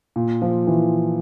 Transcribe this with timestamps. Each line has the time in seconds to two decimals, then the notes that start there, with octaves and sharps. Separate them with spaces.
0.16 A#2
0.42 F3
0.67 E3